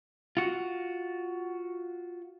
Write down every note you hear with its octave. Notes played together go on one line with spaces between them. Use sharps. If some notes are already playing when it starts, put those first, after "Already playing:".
F4 F#4